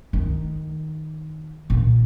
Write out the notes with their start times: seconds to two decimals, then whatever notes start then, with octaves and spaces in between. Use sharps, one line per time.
0.13 D#3
1.70 A#2